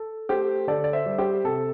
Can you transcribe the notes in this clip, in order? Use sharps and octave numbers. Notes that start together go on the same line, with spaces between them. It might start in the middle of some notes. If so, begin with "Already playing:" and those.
Already playing: A4
A3 G4 C5
D3 A4 D5
D5
C5 E5
G3
G4 C5
C3 A4